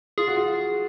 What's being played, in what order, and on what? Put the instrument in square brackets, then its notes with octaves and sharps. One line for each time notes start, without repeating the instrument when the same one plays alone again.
[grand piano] F4 [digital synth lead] G#4
[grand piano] F#4
F4